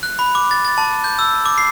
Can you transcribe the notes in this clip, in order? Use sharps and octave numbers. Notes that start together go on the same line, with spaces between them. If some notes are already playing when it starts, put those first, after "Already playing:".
F#6
B5
D6
A6
A6
A5
G6
E6
D6
C7